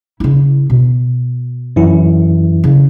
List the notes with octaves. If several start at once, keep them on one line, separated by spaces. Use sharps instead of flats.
C#3 E4
B2
F#2 E3 E4
C#3